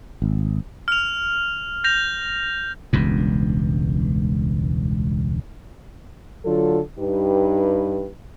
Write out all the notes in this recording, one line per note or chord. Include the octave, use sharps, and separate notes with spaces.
G#1
F6 F7
G6 A#6 F7
E1 C#2 G2
D3 F#3 F4 A4
G2 D#4 G4 B4